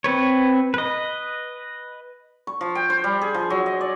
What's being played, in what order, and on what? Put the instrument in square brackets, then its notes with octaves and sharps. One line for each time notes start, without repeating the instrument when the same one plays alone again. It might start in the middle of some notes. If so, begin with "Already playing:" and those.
[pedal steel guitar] C4 B4 C#5
B4 D#5
[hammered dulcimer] C#6
F3
G5
C5
G3
G#4
F3
F#3
D#5
D5